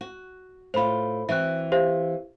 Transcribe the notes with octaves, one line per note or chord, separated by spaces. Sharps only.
F#4
A2 F4 C5 B5
E3 C4 F#4 E5 F#6
G4 C5 F5